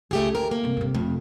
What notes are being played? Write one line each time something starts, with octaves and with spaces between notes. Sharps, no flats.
C#2 A3 G4 G#4
D2 D#3 A#4
A#3
G2 C3
G2 C3
F2 C3 A3